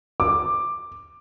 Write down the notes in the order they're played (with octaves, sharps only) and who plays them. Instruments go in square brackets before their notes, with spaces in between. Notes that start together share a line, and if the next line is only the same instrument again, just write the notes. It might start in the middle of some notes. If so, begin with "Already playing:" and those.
[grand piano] D6